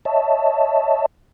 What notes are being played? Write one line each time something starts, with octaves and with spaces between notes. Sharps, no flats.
C#5 D#5 E5 A5